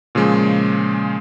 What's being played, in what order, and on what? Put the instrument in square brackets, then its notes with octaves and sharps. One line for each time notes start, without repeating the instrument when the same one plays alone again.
[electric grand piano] A#2 C#3 F3 G#3